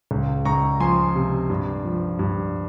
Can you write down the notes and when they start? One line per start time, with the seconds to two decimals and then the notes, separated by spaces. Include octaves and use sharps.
0.11 C#2
0.45 C#2 A#5 C#6
0.80 F3 G#5 C6
1.15 C3
1.50 G2
1.85 F3
2.19 G2